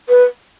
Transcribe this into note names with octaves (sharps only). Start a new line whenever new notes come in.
B4